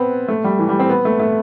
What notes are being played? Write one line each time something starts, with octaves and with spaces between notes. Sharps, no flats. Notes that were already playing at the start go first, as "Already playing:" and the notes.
Already playing: B3 C4
A3
G3
E3
G3
C4
B3
A3
A3